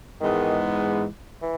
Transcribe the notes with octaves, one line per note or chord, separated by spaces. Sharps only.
G#2 D#3 E3 G#3 B3
E3